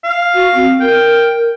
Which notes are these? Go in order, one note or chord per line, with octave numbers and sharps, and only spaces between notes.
F5
F#4
C4
A#4 G5